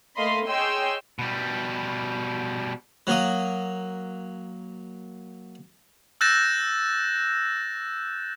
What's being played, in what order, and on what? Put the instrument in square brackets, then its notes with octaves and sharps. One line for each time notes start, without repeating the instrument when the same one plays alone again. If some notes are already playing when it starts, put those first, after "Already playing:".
[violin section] A3 A#3 D#5 F5 B5 C6
G#4 C#5 D#5 G5 C6 E6
[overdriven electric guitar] B2 G3
[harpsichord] F#3 A#3 D#6
[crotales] E6 F#6 G6 A6 A#6 E7